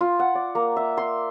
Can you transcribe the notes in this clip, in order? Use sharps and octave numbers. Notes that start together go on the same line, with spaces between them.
F4
F#5
D5
A#3
E5
C6